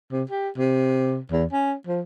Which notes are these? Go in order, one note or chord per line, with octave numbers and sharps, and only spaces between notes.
C3
G4
C3
E2
C#4
F3